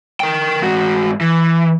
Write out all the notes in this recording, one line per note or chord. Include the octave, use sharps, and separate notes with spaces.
A#4 G5
G#2 F#4
E3